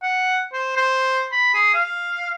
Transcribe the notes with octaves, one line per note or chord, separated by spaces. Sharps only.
F#5
C5
C5
B5
G#4
F5